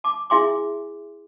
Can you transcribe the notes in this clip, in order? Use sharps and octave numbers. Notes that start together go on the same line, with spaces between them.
A5 D6
E4 G#4 E5 G#5 C6 D6